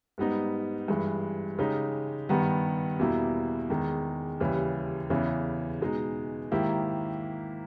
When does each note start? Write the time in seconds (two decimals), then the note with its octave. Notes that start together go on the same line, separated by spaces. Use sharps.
0.18 G#2 G3 B3 D#4
0.88 G2 E3 G#3
1.59 C#3 G#3 D#4 G4
2.29 G2 D#3 G3 B3
2.99 E2 B2 G3 A#3 E4
3.70 E2 D#3 G#3
4.40 D#2 C#3 E3 G3
5.10 E2 C#3 E3
5.81 B2 G#3 D#4
6.52 G#2 D#3 A#3 E4 G4